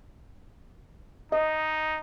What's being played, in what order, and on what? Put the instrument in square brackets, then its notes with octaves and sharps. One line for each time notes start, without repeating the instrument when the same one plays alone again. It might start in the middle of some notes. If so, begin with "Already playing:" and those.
[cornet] D#4 [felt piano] D#5